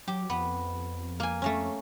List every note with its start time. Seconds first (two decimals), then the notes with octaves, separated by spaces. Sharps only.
0.08 F#3 G4
0.30 F2 B3
1.20 A#3 G#5
1.42 A3 A#3 C#4